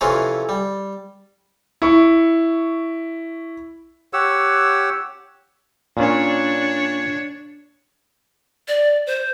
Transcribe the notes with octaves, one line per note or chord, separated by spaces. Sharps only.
F2 C3 E3 C4 C#4 F4
G3
E4 C#6
G4 C#5 F#5 E6
A#2 C#4 D4 C#5
D5
C5